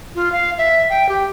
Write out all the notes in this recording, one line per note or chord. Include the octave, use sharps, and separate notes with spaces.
F4
F5
E5
G5
G4